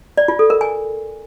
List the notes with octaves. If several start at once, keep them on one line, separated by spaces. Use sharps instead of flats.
D5
F4
A4
A#4
G#5